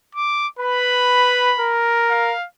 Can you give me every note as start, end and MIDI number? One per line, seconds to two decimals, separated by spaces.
0.15 0.47 86
0.59 1.54 71
0.59 1.79 83
1.59 2.33 70
2.10 2.46 77